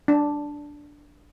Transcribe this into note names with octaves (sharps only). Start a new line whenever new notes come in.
D4